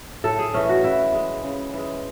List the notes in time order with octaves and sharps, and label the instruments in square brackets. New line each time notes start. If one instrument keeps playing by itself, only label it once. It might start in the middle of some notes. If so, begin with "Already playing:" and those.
[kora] A2 A4
G#4
E3 A3 C#4
F#4
C#3 E4
G#3
C#3
E3 G#3